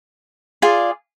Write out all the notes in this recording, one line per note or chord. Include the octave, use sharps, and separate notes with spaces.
F4 G#4 D5 G#5